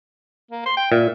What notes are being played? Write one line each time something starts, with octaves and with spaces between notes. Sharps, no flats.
A#3
C6
G5
A#2 E5